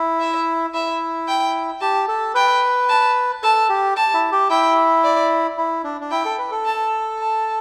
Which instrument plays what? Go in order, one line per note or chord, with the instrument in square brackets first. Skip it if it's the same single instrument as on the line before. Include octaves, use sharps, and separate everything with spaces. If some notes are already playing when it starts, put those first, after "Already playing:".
Already playing: [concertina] E4
[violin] E5
[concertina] E4 [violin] E5
[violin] G5
[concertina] G4 [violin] A5
[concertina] A4
[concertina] B4 [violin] G5
[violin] A5
[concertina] A4 [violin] A5
[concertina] G4
[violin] A5
[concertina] E4
G4
[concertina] E4 [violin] G5
[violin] D5
[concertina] E4
D4
D4
[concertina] E4 [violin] G5
[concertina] A4
B4
A4
[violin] A5
A5